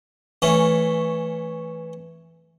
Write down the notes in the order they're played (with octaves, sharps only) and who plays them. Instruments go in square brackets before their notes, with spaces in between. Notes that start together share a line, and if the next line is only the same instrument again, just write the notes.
[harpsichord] E3 A3 C#4